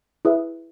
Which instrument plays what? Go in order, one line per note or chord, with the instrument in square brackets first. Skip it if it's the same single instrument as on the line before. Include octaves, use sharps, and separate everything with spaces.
[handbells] E4 G#4 B4 E5